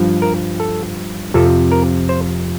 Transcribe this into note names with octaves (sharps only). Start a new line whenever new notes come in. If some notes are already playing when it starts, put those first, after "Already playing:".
Already playing: G2 F3
A#4
A4
F2 C3 F3 A4
A#4
C5